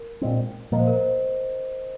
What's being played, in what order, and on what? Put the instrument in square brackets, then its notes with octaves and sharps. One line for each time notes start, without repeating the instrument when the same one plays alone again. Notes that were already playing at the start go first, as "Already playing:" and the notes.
Already playing: [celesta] A#4
[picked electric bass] A#2 G#3 C4
[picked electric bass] A#2 F3 A#3 [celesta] D#5
[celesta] C5
A#4
C5